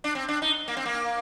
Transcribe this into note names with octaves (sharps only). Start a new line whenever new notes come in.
D4
C4
D4
D#4
A#3
C4
A#3